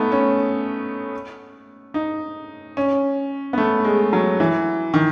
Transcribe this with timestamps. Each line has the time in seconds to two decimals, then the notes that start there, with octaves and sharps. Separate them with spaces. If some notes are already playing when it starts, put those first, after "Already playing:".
Already playing: A3 B3 D#4
0.12 C#4
1.94 D#4
2.77 C#4
3.53 B3
3.58 A3
3.84 G#3
4.13 F#3
4.40 E3
4.94 D#3